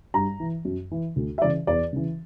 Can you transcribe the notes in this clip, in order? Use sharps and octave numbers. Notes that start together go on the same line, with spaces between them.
G2 A#5
E3
F#2
E3
D2
E5
C#3 E3 D5
E2 D5
C#3 E3